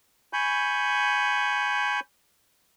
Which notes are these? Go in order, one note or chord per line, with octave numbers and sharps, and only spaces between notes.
G#5 B5 C#6 G6